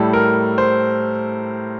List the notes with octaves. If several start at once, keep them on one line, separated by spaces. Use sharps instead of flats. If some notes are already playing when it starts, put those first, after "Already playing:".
Already playing: A2 G3 A4
A#4
C5